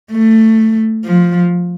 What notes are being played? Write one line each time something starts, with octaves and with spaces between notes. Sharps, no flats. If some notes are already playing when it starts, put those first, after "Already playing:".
A3
F3